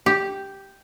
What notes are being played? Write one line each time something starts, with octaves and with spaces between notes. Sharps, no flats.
G4